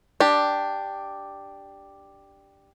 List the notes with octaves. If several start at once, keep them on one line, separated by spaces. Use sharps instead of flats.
D4 G4